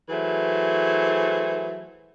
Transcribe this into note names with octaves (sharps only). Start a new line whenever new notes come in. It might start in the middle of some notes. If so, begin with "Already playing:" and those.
E3 F#3 A3 G#4 C5